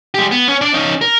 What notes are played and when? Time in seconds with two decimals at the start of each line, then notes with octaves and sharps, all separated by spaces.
0.14 G#3 G4
0.31 B3
0.48 C#4
0.61 D4 D5
0.74 C#4 D#4
1.01 A#4